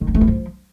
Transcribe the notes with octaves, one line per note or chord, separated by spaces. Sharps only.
D#3
A#3
A3
E4
F3